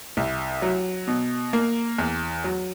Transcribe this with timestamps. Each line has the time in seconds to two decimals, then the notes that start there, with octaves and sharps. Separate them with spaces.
0.17 C2
0.62 F#3
1.08 B2
1.53 A#3
1.98 E2
2.44 F#3